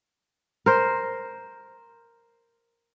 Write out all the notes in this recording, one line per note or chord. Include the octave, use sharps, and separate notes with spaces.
A#4 C5